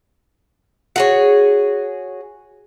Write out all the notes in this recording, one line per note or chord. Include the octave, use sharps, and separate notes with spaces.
F#4 G#4 C#5